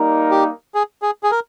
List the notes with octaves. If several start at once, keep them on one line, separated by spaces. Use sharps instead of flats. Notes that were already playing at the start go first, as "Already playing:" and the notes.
Already playing: G3 A#3 D#4 A#4
G4
G#4
G#4
G#4
A#4